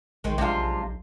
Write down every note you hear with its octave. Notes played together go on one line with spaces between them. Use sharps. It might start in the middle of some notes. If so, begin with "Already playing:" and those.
A#1 D#3 G#3
B1 C3 G#3 D4 F4